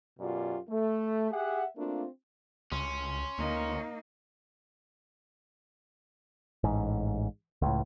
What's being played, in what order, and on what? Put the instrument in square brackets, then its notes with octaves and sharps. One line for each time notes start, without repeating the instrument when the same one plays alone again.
[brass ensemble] F#2 B2 F4 G4 D5
A3
G4 G#4 E5 F#5
A3 A#3 C4 D4 F4
[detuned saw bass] C#2 [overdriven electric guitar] C#4 [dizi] C6
[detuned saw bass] D2 [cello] A#3 D#4
[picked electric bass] A1 G#2
C#2 A2